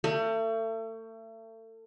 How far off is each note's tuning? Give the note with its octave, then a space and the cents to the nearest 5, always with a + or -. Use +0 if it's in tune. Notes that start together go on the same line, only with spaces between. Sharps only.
A3 +35